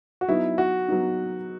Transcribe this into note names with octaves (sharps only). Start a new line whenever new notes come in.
F#4
F#3 B3 D#4 E4
F#4
F#3 B3 D#4